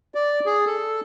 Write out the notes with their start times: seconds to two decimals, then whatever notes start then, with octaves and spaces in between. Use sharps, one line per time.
0.15 D5
0.46 G#4
0.66 A4